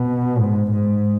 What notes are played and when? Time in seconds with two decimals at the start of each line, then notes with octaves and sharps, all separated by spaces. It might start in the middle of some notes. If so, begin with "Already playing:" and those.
Already playing: B2
0.38 G#2
0.71 G#2